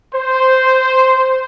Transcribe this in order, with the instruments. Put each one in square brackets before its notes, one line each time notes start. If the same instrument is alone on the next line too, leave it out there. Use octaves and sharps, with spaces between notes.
[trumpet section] C5